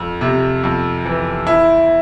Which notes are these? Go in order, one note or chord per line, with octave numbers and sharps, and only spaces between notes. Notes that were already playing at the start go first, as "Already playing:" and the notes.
Already playing: F2
C3
F2
E3
E4